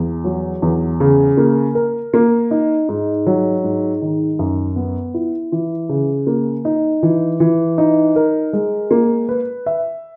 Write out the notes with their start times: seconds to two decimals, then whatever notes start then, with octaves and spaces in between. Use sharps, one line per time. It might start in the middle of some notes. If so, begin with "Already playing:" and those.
Already playing: E2
0.24 F#3
0.62 E2
1.00 C#3
1.37 A#3
1.75 A#4
2.14 A#3
2.51 D#4
2.89 G#2
3.27 F#3
3.64 G#2
4.01 D#3
4.39 F#2
4.76 B3
5.14 E4
5.52 E3
5.89 C#3
6.27 A#3
6.65 D#4
7.03 E3
7.40 E3
7.78 D#4
8.16 A#4
8.53 G#3
8.91 A#3
9.29 B4
9.66 E5